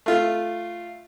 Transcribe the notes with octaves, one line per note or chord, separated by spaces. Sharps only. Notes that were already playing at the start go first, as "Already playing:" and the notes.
A3 F4